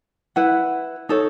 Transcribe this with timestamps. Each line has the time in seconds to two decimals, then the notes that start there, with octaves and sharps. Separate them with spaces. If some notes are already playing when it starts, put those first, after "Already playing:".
0.36 E4 B4 F#5
1.09 D#4 A4 C#5